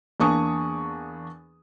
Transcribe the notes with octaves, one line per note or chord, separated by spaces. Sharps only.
E2 A#3 D4 G#5 C#6 D#6